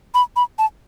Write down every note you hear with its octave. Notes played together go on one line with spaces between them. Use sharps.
B5
B5
A5